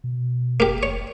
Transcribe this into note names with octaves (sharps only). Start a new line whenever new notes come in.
B2
F#1 A#3 G4
F1 C#5